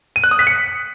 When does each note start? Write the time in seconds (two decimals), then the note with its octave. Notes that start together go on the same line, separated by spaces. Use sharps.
0.16 D#7
0.24 F#6
0.31 D#6
0.39 B6
0.47 C#7